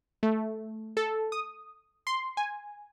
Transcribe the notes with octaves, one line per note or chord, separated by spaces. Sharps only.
A3
A4
D#6
C6
G#5